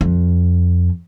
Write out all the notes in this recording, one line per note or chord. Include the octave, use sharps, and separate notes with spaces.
F2